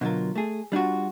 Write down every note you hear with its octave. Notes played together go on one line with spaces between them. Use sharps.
B2 D3 F#3 F4 A#4
A3 G#4
G3 D4 F4 F#4